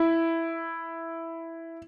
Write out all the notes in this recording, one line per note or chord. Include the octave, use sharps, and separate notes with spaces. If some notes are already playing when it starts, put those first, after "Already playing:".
Already playing: E4